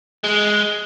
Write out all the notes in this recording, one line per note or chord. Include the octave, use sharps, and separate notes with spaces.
G#3